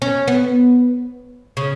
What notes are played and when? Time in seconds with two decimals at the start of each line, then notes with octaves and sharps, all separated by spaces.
0.02 C#4
0.28 B3
1.57 C#3